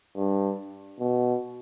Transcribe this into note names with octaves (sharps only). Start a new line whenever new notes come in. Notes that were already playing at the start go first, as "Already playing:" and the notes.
G2
B2